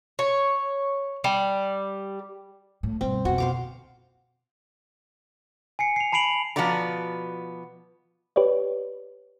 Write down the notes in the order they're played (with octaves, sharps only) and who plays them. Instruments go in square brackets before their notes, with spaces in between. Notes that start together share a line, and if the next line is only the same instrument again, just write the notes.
[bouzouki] C#5
G3
[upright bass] A2
[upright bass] G2 B2 [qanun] C4
[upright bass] F2 B2 [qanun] F#4
[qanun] C5 F5 D6
[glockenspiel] G#5 C7 C#7
C7 F7
A5 B5 C7 D7 F7 F#7
[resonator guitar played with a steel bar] B2 F3 B3 F#4 D5 A#5
[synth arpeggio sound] G4 B4 C#5 D5